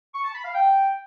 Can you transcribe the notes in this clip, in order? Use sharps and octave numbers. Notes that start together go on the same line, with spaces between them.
C#6
A5
B5
F5
G5